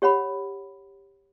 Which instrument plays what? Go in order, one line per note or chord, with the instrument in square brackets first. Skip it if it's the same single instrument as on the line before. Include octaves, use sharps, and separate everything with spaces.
[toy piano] G4 C#5 F#5 B5